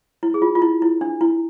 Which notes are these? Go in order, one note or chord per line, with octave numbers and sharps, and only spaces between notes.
E4
G#4
F4
F4
E4
E4
D4
E4